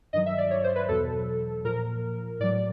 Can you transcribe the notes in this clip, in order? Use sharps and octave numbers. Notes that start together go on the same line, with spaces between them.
G2 D#3 F#3 D#5
E5
D5
C#5
C5
B4
E2 B2 F#3 A4
A#2 F3 A#4
A2 F#3 D5